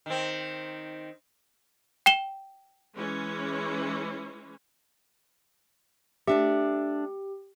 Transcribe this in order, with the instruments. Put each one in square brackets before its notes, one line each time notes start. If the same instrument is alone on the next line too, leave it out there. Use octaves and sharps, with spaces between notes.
[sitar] D#3 C4
[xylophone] G5 E7 G7
[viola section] E3 G#3 C#4
[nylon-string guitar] A3 D4 E5 [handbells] G4